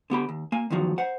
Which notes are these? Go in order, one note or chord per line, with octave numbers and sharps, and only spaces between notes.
D3 B3 G4 B5
D#2
A#3 G#5
E2 G2 D#3 F3 F#3
C5 F#5